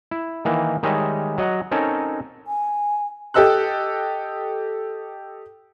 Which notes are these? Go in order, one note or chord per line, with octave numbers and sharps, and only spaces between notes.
E4
D#3 E3 A#3
D#3 G3 G#3 C#5 D#5 E5
F#3 D#5 F#5 A#5
C4 C#4 D#4 A4 A#4 C#5
G#5
G4 A4 D#5 E6 F#6